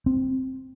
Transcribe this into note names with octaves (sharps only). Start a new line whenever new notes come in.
C4